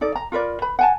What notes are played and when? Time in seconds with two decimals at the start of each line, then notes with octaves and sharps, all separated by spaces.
0.01 D#4 A4 D5
0.16 A#5
0.32 F4 A#4 B4 D5
0.62 B4 B5
0.79 F#5 G#5 A5